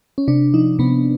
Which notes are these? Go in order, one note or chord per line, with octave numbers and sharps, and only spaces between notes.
C#4
C3 D4
F3 D#4
C3 B3